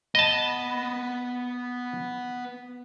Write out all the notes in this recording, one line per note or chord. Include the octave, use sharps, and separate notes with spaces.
B3 D#5 A5 B5